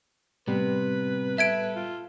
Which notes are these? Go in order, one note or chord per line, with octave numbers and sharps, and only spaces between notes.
A2 C3 G3 B3 B4
A4 E5 G#6 D7
F4